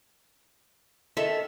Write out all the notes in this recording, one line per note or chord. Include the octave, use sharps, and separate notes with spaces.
D#3 A4 E5 A5